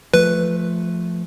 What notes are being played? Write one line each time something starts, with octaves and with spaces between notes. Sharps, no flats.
F3 A3 B4